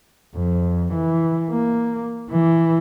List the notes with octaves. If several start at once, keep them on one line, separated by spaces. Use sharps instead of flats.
F2
E3
A#3
E3